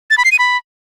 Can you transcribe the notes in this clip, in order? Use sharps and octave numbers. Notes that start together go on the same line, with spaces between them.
A6
B5
C7
D#7
B5